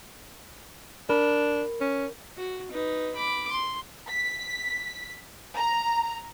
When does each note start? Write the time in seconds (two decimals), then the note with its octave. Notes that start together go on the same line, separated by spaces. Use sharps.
1.09 D4 A#4 B5
1.81 C#4
2.37 F#4
2.71 D#4 B4
3.15 B5 D6
3.51 C6
4.08 B6
5.56 A#5